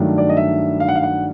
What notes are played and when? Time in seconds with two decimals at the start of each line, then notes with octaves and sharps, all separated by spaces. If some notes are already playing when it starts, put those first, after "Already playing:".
Already playing: G2 D#3 F#3 A3 D4
0.18 D5
0.29 D#5
0.37 E5
0.80 F5
0.88 F#5
0.95 F5
1.03 F#5